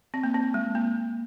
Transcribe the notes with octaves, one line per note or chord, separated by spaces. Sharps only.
C4
A#3
C4
G#3
A#3